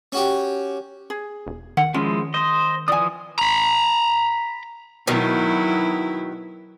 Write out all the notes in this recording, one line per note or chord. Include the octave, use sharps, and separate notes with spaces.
C#4 F#4 G4
G#4
E1
D#3 F#5
F3 G#3 C#4 E4
C5 D#5
E3 F3 D5 G#5 D#6
A#5 B5
B2 D#3 F#3 E4